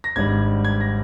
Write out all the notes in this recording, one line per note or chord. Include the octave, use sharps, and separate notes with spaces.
A#6
G#1 G#2 G3 D4 G#6
G#6
A#6